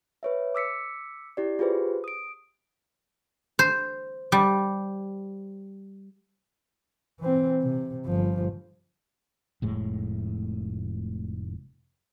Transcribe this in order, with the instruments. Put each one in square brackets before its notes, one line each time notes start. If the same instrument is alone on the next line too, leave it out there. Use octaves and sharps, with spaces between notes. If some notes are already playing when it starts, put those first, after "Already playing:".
[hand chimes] B4 C#5 E5
D6 E6 B6 C#7
E4 G4 D5
F4 G4 G#4 B4 C5
D#6 D7
[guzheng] C5
G3
[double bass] E3 C4
C3
G1 F3
[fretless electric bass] F1 A2 G#3